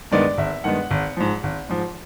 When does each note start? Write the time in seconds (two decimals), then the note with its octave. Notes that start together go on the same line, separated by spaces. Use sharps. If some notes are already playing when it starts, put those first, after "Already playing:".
0.11 G2 D#3 G#3 B3 D5
0.38 G#1 E5
0.64 G2 D#3 G#3 B3 F#5
0.91 G#1
1.17 G#2 F3
1.43 G#1
1.69 G#2 F3